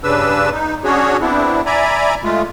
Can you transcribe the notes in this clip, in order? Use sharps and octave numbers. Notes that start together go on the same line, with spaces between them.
G2 C#3 D4 B4 E6
D#4
C#4 D4 F#4 G#4 C#5
B3 C4 D4 E4
D5 E5 G#5 A#5 B5
G#3 A3 F4